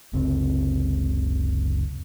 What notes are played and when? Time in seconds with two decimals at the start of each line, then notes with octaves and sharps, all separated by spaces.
0.13 F#1 C#2 C3 C4